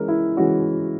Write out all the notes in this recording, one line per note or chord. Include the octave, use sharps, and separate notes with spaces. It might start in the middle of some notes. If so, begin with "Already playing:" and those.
Already playing: E3 G#3 C#4 A#4
E4
E3 G#3 C#4 F#4